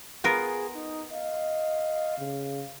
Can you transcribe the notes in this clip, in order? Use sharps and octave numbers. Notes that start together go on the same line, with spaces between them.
B3 F4 G#4 A#4
D#4
D#5 F5
C#3